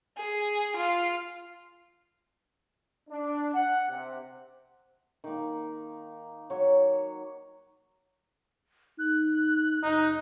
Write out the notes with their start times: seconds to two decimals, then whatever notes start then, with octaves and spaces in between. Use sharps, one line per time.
0.18 G#4
0.77 F4
3.09 D4
3.54 F#5
3.90 C3
5.24 D#3 A#3
6.50 F#3 C#5
8.99 D#4 F#6
9.83 F#1 D#4